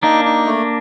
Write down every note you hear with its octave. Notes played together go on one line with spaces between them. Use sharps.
A#3 D4 D#4
D#4
A3